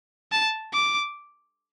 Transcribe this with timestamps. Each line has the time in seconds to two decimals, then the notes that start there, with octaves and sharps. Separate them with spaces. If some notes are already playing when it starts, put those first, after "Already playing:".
0.32 A5
0.73 D6